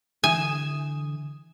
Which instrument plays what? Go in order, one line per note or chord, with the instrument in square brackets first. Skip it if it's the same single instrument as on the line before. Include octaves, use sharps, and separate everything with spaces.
[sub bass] D3 [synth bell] E3 D#6 E7 [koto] G#5